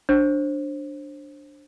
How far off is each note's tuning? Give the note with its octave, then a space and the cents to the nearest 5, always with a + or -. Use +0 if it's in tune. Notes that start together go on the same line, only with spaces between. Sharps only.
D4 +0 C5 +25